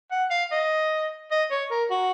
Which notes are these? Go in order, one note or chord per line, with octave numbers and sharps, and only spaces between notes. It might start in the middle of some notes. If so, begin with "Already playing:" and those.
F#5
F5
D#5
D#5
C#5
A#4
F#4